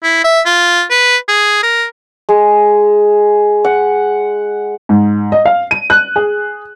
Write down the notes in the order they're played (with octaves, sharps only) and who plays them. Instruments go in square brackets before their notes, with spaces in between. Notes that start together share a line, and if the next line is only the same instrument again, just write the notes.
[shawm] E4
E5
F4
B4
G#4
A#4
[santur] G#3
F#5
[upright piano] G#2
D#5
F5
D#7
F#6
G#4